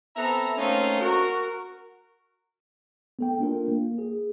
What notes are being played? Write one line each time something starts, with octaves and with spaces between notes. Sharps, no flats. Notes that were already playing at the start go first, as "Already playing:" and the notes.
B3 C4 A4 E5 A#5
A3 A#3 C4 C#4 D#4 F4
F#4 A#4
B3 A4 G5
A#3 D4 F4 A#4
A#3
G#4